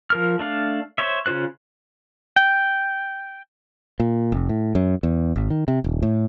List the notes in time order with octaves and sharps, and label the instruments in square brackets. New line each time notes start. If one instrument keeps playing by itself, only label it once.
[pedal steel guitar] F3 A#4 F6
A3 D4 F5
C5 C#5 E5
C#3 C#4 F4 C5 F#6
G5
[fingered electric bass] A#2
F1
A2
F#2
E2
G#1
D#3
C3
D#1
A2